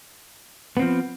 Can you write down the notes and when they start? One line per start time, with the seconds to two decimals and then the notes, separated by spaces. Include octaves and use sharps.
0.77 B3
0.79 C4
0.82 F3